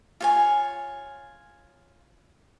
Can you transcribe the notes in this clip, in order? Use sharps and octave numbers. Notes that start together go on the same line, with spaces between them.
F4 C#5 G#5